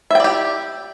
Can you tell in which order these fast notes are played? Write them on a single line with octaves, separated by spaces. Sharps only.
E5 G5 D5 G4